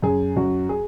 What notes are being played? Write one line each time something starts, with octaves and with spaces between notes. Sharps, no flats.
F#2 G#4
F#2 F#4
G#4